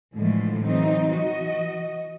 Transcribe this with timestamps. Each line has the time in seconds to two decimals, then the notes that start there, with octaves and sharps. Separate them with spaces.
0.14 A2 D3 E3 F3 G#3 A3
0.65 E3 F#3 C4 D#4
1.13 E3 F#4 D#5